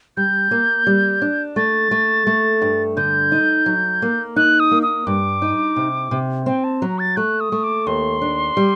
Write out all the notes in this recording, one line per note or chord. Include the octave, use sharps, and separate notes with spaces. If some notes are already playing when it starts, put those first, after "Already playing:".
G3 G6
A#3
G3
D4
A3 A6
A3
A3
G2
D3 G6
D#4
F#3
A#3
D#4 F#6
D#6
A#3
D#6
G2 D6
D#4
C3
C3
C4 G5
A5
F#3 A#5
A6
A3 F#6
D#6
A3
D6
D#2 C6
D4
G3